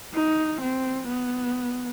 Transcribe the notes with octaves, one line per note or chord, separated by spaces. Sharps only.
D#4
C4
B3